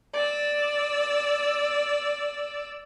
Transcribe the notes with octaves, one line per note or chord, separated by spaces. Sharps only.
D5 E6